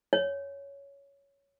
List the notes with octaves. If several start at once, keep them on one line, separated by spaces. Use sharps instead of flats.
C#5